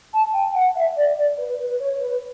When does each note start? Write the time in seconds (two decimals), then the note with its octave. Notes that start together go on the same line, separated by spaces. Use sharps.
0.13 A5
0.33 G5
0.54 F#5
0.75 E5
0.96 D5
1.17 D5
1.38 B4
1.59 B4
1.80 C#5
2.00 B4